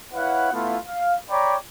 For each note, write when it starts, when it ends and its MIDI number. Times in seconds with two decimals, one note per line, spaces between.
0.14 0.49 64
0.14 0.49 71
0.14 0.49 73
0.14 0.49 77
0.14 0.49 78
0.53 0.78 57
0.53 0.78 59
0.53 0.78 64
0.53 0.78 65
0.88 1.16 77
1.30 1.56 73
1.30 1.56 74
1.30 1.56 79
1.30 1.56 82
1.30 1.56 83
1.30 1.56 86